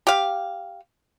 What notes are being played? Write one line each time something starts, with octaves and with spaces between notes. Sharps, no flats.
G4 F5